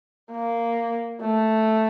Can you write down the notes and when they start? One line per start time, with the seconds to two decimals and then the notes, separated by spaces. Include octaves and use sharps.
0.31 A#3
1.21 A3